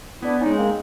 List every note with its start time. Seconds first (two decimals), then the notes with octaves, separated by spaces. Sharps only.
0.22 B3 D4 E4
0.41 G#3 C#4 D#4
0.57 A#3 C4